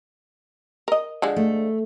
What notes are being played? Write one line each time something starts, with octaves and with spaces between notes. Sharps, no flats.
A#4 D#5
D3 F3 G#3
A3